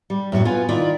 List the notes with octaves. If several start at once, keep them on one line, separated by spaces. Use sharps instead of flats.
G3
F#2 A2 F4 F#4
B3 F4 G#5
D#3 E4 F4 D5